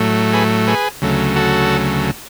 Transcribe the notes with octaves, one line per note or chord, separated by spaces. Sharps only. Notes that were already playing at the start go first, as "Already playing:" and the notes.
Already playing: A2 F#3 A3
G#4 B4
G#4 B4
D2 C#3 F#3 A3
F#4 A4